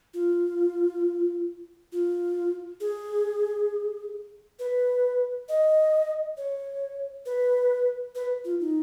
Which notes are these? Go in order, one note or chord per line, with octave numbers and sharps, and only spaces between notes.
F4
F4
G#4
B4
D#5
C#5
B4
B4
F4
D#4